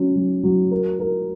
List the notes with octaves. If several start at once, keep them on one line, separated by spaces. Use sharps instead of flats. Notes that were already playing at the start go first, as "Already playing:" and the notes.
Already playing: F#3 C#4
F#3
F#3
A#4
A#4